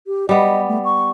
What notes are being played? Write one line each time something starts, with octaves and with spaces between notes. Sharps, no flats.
G4
G3 B3 D#5
A3
C#6